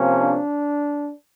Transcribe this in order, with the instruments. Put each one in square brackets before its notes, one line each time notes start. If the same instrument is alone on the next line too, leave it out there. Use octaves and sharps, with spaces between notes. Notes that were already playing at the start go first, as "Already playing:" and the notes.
Already playing: [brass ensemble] C3 F3 A#3 C#4
D4